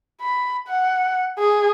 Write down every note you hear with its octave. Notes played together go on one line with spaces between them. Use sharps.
B5
F#5
G#4